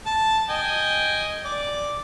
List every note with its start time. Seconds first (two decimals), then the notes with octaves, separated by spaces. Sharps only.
0.06 A5
0.49 D#5 G5 G#5
1.45 D5